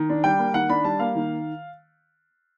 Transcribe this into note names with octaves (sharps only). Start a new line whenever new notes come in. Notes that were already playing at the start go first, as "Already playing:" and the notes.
Already playing: D#3
D4
G3 G5
A#3
D#3 F#5
D4 B5
G3 A5
A#3 F5
D#3